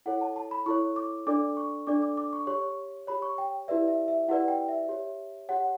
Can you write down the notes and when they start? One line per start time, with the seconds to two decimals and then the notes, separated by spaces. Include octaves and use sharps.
0.06 E4 A4 C#5 F#5
0.21 A5
0.36 A5
0.51 B5
0.66 E4 A4 C#5 C#6
0.96 D6
1.27 D4 A4 D5 D6
1.57 C#6
1.87 D4 A4 D5 D6
2.02 D6
2.17 D6
2.33 C#6
2.47 G4 C#5 C#6
3.07 G4 C#5 B5
3.22 C#6
3.38 G5
3.68 E4 G4 B4 D5 E5
3.88 E5
4.08 E5
4.28 E4 G4 B4 D5 F#5
4.48 G5
4.68 E5
4.89 G4 C#5
5.49 G4 C#5 F#5